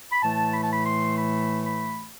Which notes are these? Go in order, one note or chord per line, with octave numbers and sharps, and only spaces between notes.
B5
A2 E3 A3 A5
B5
A5
B5
C6
B5
B5